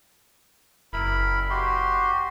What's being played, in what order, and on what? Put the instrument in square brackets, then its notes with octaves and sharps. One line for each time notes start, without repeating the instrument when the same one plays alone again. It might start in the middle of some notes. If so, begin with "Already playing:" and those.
[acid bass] F#1 [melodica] E4 A#4 B5
[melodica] F#4 G4 C6